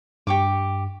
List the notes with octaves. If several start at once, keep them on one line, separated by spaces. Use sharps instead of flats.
G2 G4 C#6 D6